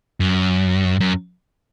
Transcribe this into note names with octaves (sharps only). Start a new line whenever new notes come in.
F#2
F#2